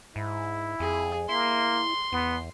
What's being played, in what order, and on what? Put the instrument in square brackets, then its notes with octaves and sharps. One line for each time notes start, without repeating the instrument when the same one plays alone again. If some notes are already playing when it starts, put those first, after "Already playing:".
[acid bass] G#2 [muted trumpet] E4
[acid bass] F2 [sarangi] G#4
[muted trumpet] A#3 [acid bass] E4 [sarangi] C6
[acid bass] E2 [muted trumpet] B3